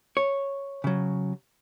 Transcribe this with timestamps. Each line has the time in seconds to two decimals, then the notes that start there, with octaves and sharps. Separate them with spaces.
0.17 C#5
0.84 C#3 F#3